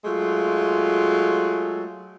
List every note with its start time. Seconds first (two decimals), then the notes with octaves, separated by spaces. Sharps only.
0.05 F#3 G#3 A3 F4